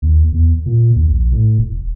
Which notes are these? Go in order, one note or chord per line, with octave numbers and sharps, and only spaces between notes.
D#2
E2
A#2
D#2
A#1
A2
E1